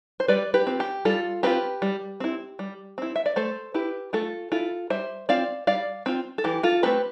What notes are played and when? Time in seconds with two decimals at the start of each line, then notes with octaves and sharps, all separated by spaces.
0.20 C5
0.28 G3 B4 D5
0.54 G4 B4
0.67 C4 F4
0.80 G4
1.05 G3 F4 A4
1.43 C4 F4 G4 B4
1.82 G3
2.20 C4 E4
2.59 G3
2.98 C4 E4
3.16 E5
3.26 D5
3.36 A3 A4 C5
3.74 E4 G4 B4
4.13 A3 F4 A4
4.52 E4 F4 A4
4.90 G3 C5 E5
5.29 C4 F4 D5 F5
5.67 G3 D5 F5
6.06 C4 F4
6.38 A4
6.44 E3 G4
6.63 F4 A4
6.83 A3 C4 G4 B4